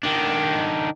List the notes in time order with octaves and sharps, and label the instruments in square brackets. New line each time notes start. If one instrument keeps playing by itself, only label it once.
[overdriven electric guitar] D#3 D4